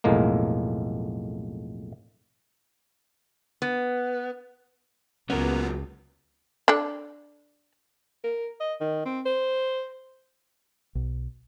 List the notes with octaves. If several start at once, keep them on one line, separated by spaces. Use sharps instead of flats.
B1 F2 A2 G#3 A#3
B3
C#2 A#2 F#3 B3 C#4 A#4
D4 A4
A#4
D#5
D#3
C4
C5
B1